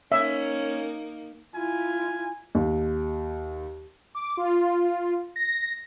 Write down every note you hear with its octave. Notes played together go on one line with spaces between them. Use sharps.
A#3 C#4 D#4 E5
E4 F4 G#5
D#2
D6
F4
A#6